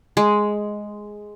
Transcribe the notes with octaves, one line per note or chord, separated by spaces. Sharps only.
G#3